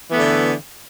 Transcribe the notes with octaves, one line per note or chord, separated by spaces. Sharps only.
D3 E3 A3 B3